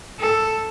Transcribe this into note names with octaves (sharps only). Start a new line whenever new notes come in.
A4